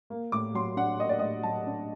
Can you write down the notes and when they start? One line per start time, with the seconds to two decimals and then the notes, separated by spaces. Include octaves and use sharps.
0.10 A#3
0.32 A2 D6
0.54 F#3 C6
0.77 D4 F#5
0.99 A#3 D#5
1.09 D5
1.19 A2 D#5
1.43 F#3 A5
1.67 D4